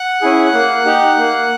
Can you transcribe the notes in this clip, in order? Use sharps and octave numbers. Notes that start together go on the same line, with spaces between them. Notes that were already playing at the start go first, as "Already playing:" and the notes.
Already playing: F#5 F#6
C#4 E4 G#4
A#3
D#4 G4
A#3